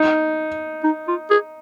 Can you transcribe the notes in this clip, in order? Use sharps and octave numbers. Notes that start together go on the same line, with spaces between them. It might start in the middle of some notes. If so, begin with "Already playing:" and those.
Already playing: D#4
D#4
F4
G#4